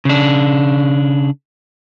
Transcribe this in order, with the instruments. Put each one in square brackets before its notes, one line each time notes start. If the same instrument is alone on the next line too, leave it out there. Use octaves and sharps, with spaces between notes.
[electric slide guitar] C#3 D4